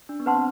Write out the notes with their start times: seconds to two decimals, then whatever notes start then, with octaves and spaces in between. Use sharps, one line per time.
0.09 D4
0.20 B3
0.26 C4 B4 F#5 A5 C6